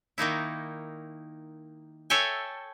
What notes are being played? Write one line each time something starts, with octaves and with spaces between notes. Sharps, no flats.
D#3 A#3 D#4 E4
A4 C#5 E5 G5 G#5